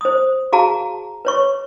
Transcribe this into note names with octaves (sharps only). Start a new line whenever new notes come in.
C5 D#6
F#4 G#4 F5 A5 A#5
B4 C#5 C#6